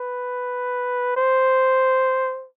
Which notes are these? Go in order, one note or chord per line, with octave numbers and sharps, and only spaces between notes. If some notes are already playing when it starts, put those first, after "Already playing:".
Already playing: B4
C5